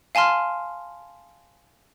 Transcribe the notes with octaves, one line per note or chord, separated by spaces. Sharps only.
F5 G#5 A5 C6 F6